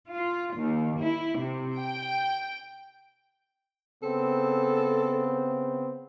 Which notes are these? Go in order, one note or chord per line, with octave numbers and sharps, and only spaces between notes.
F4
D#2
E4
C3
G5
C#3 B3 C4 A4